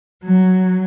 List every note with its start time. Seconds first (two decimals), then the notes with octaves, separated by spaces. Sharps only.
0.23 F#3